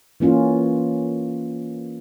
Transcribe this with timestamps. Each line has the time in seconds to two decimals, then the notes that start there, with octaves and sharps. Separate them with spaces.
0.20 E3 A#3 C#4 F4